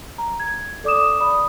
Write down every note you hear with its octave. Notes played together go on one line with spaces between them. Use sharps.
A#5
G#6
A4 D5 D6 D#6 E7
D5 B5 D#6